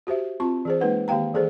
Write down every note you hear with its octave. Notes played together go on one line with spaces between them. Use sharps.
F#4 G4 C5 E5
C4 F4 A5 C#6
E3 G#4 C5
G#3 A#3 D#4 B4 F#5
D#3 A#3 G4 F5 G5 A#5
E3 G#4 A4 C5